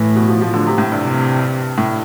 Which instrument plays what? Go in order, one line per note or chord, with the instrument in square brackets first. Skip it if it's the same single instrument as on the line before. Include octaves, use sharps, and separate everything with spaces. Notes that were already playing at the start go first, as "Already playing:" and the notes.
Already playing: [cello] A2 [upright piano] E3
[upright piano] B2
F3
F3
D3
C3
A2
G2
[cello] C3
[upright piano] A2